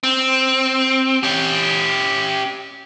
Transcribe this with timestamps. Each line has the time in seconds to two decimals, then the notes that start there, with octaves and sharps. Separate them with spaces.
0.03 C4
1.23 C#4 G4